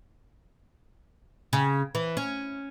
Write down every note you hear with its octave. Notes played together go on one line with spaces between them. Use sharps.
C#3
E3
C#4